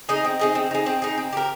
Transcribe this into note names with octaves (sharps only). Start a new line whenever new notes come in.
D#4 G#4 D#5
C4
D#4 G#4 D#5
C4
D#4 G#4
C4
D#4 G#4
C4
G4 A#4